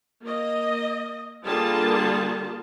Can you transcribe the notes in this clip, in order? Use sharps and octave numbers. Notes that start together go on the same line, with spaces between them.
A#3 D#5
D3 G3 A#3 F4 G#4 A5